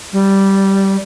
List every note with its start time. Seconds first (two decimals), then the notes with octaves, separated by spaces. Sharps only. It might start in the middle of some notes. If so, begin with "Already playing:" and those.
0.13 G3